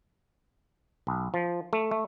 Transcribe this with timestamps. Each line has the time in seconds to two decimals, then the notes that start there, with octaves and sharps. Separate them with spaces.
1.07 B1
1.34 F3
1.73 A3
1.91 A3